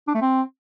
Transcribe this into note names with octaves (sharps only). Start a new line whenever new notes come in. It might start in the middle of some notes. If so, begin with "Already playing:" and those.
D4
A3
C4